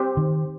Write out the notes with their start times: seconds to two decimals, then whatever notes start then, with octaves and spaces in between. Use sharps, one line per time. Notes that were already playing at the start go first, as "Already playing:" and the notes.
Already playing: C4 G4 C5
0.17 D#3